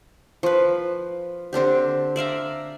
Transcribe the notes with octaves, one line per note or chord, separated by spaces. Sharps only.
F3 B4
D3 C4 D4 G4
D5 E5 F5 A#5